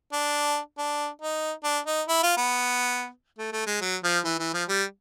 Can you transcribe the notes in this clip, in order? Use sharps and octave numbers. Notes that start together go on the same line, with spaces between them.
D4
D4
D#4
D4
D#4
E4
F4
B3
A3
A3
G#3
F#3
F3
E3
E3
F3
G3